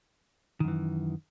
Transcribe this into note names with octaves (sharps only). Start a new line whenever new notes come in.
F#2 D#3 E3